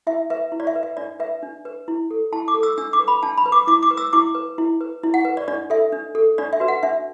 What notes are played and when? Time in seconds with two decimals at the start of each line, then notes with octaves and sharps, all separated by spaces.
0.07 E4 E5
0.30 B4 E5
0.52 E4
0.60 D5
0.67 E5
0.75 B4
0.83 E5
0.97 D4 D5
1.20 B4 E5
1.43 D4
1.65 B4
1.88 E4
2.11 A4
2.33 E4 A5
2.48 D6
2.54 A4
2.63 E6
2.78 D4 E6
2.93 D6
3.00 B4
3.08 B5
3.23 D4 A5
3.38 B5
3.46 B4
3.52 D6
3.67 E4 D6
3.83 D6
3.91 B4
3.97 E6
4.13 E4 D6
4.35 B4
4.58 E4
4.81 B4
5.03 E4
5.14 F#5
5.25 B4
5.37 D5
5.48 D4 D5
5.70 A4 E5
5.92 D4
6.15 A4
6.38 D4 D5
6.53 E5
6.60 F#4 B4
6.68 F#5
6.83 D4 E5